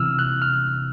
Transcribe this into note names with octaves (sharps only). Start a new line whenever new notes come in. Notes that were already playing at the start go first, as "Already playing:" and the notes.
Already playing: C3 E3 E6 F6
F#6
F6